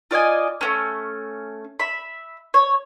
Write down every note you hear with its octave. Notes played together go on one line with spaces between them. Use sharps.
F4 D5 D#5 G#5
A3 A#3 C#4
E5 B5
C#5